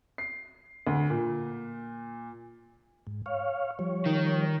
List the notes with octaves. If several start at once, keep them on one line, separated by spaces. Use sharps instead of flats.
C7
D2
A#2
G#2
C#5 F5
F3 G3 C#5
D#3